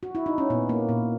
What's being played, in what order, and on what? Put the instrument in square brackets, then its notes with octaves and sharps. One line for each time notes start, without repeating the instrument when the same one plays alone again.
[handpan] F#4
E4
D#4
C#4
A#2 B3
A#3
A#2